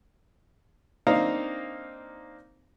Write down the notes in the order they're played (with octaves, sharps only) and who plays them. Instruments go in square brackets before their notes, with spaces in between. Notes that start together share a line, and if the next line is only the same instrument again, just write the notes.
[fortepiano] A#3 C4 D4 D#4 F5 A#5